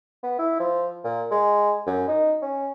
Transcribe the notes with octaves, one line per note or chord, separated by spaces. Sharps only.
B3
E4
F3
A#2
G#3
F#2
D#4
C#4